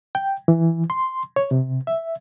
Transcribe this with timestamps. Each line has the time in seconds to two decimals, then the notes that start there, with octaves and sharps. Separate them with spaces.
0.15 G5
0.48 E3
0.90 C6
1.36 C#5
1.51 C3
1.87 E5